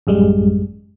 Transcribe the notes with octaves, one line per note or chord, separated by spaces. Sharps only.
A1 F#2 G3 G#3